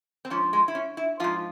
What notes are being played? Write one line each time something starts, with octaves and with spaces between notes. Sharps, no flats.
C4
G#2 F3 C#4
G#3
E4
C#4
E4
G#2 F3 F4